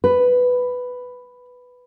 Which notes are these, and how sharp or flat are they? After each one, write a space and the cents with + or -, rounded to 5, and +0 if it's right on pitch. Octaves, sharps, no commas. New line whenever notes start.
B4 +5